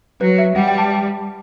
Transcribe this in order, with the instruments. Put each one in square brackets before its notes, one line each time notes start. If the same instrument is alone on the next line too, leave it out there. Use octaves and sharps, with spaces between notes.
[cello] F#3 [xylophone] B4
[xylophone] E5
[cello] G3 [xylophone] F#5
[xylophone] G5
A5